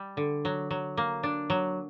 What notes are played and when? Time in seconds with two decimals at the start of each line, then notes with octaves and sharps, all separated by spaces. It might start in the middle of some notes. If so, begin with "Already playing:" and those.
Already playing: G3
0.17 D3
0.45 F#3
0.71 F#3
0.97 A#3
1.23 D4
1.50 F#3